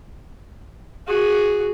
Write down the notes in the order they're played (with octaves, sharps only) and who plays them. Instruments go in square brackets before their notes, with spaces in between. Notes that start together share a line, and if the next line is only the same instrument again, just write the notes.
[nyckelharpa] F#4 G#4